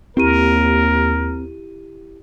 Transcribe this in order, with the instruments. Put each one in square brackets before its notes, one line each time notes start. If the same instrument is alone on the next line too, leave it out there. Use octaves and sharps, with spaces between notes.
[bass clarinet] D#2 [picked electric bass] C4 [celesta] E4 G4 D#7 [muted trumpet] A#4